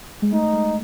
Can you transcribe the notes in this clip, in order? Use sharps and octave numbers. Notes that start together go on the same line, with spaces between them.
G#3
A3 D#4
G#3